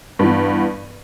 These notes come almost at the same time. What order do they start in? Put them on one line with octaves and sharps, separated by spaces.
G2 E3 B3